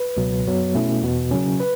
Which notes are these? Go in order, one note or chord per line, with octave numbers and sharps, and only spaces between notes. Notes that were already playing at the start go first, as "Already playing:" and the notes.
Already playing: B4
C#2 B2 F#3
F#2 F#3 B3
B2 A3 C#4 E4
E2 B2 B3
C#3 F#3 C#4
B4